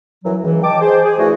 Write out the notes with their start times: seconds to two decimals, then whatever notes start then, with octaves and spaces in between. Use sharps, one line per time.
0.24 F#2 E3 F#3
0.42 C#2 E3
0.62 D#5 G5 A5 D6
0.80 G#4 C5
1.04 G#4
1.18 D3 E3 A3 F#4 G#4